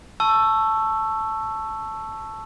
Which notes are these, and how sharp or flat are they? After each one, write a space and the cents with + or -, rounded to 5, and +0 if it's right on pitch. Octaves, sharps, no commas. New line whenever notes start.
A5 +0 C#6 +0 E6 +10